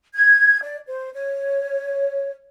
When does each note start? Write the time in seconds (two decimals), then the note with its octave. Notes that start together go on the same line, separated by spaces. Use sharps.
0.15 G#6
0.62 D5
0.87 C5
1.13 C#5